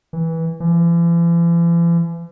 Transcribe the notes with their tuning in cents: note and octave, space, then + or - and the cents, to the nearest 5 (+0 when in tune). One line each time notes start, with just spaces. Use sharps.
E3 -15
E3 +45